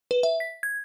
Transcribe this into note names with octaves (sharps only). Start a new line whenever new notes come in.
B4
E5
B6
G#6